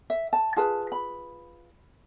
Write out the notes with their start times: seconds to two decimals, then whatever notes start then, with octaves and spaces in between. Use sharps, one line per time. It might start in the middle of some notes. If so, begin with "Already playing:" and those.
0.10 E5
0.33 A5
0.56 F4 G#4 B4 A5
0.92 B5